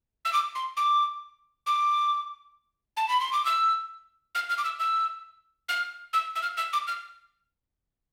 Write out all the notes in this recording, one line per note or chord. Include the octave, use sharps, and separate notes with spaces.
E6
D6
C6
D6
D6
A5
B5
C6
D6
E6
F6
F6
D6
E6
E6
F6
E6
E6
F6
E6
D6
F6